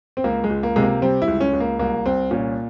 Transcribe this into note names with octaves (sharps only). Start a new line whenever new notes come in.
C4
C#2 A#3
G#3
C#2
A#3
C3 G#3
A#3
G3 C4
E4
C#2
C#4
C#2
A#3
C2 A#3
C2 C4
A#2 C#4